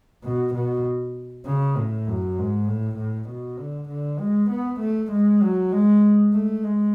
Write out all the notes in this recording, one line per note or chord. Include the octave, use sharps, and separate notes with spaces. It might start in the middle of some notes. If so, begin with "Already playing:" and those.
B2
B2
C#3
A2
F#2
G#2
A2
A2
B2
D3
D3
G#3
B3
A3
G#3
F#3
G#3
A3
G#3